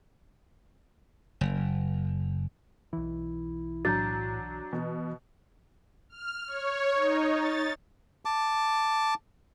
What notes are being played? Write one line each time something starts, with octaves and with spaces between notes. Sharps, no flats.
F#1
B1 E3 E4
A2 F#3 D4 A#5 G6 A6
B2 E3
F6
C#5
D#4
A6
A5 D6